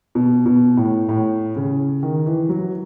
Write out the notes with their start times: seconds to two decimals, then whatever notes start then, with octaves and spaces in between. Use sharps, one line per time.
0.15 B2
0.46 B2
0.77 A2
1.09 A2
1.56 C#3
2.03 D#3
2.26 E3
2.49 F#3